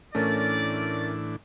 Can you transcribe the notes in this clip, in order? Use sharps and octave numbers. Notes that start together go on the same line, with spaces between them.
A2 E3 A3 C#4 D4 A#4 D5